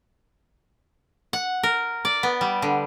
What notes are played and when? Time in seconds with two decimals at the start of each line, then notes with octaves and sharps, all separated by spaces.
1.33 F#5
1.63 A#4
2.05 D5
2.23 B3
2.41 G3
2.62 D3